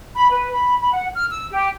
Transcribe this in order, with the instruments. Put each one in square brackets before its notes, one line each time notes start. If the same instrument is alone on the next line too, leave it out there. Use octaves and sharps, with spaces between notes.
[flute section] B5
B4
B5
B5
F#5
F6
E6
G4